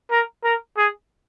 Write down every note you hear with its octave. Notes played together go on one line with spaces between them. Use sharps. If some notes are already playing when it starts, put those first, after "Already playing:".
A#4
A#4
G#4